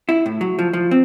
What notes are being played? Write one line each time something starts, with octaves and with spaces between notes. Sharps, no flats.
E4
A2
F#3
F3
F3
C4